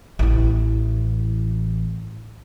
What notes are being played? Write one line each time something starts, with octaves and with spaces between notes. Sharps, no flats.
A1 E4